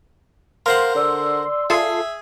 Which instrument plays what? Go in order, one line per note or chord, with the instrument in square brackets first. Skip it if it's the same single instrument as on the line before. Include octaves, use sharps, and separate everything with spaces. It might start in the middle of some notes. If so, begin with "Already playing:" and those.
[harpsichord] A#4 C5 F#5 [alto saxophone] F5 [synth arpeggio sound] C6
[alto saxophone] D3 [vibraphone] D5 D6 E6
[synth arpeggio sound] F4 A4 C7 [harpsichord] G#4 [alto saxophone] E5